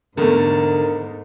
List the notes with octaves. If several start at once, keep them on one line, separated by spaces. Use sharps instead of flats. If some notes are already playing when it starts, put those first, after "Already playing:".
E2 G#2 D3 A3 A#4